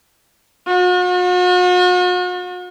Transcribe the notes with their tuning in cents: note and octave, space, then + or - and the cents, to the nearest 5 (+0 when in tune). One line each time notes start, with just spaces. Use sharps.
F#4 -45